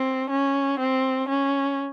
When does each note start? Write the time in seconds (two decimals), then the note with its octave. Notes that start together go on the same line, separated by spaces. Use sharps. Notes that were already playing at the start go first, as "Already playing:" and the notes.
Already playing: C4
0.30 C#4
0.79 C4
1.28 C#4